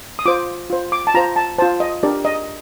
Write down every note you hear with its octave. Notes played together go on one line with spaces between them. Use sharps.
D#6
F4 C5 D6
F4 C5
D6
A5
F4 C5 A#5
A5
F4 C5 A5
D#5
D4 G4 A#4 D5
D#5